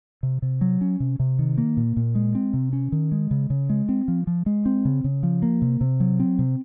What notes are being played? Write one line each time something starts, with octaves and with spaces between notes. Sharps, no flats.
C3
C3
F#3
C#4
C3
C3
D#3
A#3
A#2
A#2
G#3
C4
C3
C#4
D#3
G#3
C#3
C#3
G#3
C4
F3
F3
G#3
C4
C#3
C#3
F3
A#3
C3
C3
F#3
C4
C3